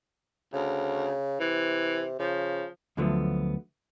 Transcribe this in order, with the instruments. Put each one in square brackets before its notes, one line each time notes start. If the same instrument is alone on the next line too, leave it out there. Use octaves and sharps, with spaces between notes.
[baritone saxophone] D2 [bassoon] C#3
[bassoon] C3 [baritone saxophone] E3
[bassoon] C#3 [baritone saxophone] F3
[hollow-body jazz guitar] D2 D3 F3 F#3 A3 B3